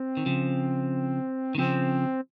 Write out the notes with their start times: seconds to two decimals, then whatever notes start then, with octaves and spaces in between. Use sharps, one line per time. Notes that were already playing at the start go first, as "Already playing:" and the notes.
Already playing: C4
0.17 D#3
0.26 C#3 F3
1.55 D#3
1.58 C#3 F3 C4